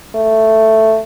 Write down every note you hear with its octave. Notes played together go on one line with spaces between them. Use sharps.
A3